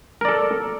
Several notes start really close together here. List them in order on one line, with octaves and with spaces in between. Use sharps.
A#4 D5 A4